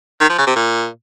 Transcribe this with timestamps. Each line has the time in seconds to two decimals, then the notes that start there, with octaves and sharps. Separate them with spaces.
0.21 D#3
0.29 F3
0.38 C#3
0.47 C3
0.56 A#2